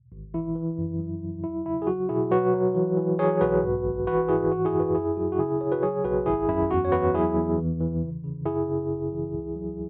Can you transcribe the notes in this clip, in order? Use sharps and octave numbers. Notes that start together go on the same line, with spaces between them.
G#1
E3 E4
E3
F#2
F#3
F#3
E2 E4
C#3 E4
G#4
F#3 F#4
B2 E4 G#4
F#3 F#4 B4
F#3
E3
E3
F#3 G#4 C#5
B1 F#4 B4
G#2
G#1
E3 F#4 B4
G#2 E4 G#4
E3 F#4
E4 G#4
F#2
F#4 B4
F#2 E4 G#4
F#3 F#4
F#4
C#3 E4 G#4
C#3 G#4 C#5
F#4 B4
F#3 G#4 C#5
B1 F#4 B4
G#1 E4 G#4
F#2 E4
E2 F#4
C#5
E2 F#4 B4
F#3 E4 G#4
E2
E3
E3
C#3
C#3
F#2 E4 G#4
C#3
G#1
E3
C#2
F#3